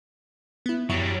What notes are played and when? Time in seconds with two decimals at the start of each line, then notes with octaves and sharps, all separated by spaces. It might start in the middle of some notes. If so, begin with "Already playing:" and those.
0.66 B3 E4
0.89 F#2 F#3 G3 E4 C#6